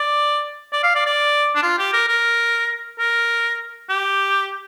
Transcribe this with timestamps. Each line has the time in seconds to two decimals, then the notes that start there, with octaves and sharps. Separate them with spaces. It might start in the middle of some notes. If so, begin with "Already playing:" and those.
Already playing: D5
0.73 D5
0.83 F5
0.95 D5
1.06 D5
1.55 D4
1.63 F4
1.78 G4
1.93 A#4
2.08 A#4
2.99 A#4
3.90 G4